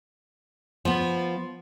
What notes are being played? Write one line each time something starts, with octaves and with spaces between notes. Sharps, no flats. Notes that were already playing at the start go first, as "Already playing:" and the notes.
F3 B3